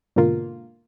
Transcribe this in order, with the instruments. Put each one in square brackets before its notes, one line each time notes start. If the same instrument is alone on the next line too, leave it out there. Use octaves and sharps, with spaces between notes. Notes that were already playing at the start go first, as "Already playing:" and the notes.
[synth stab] G#2 B2 D3 A#3 F4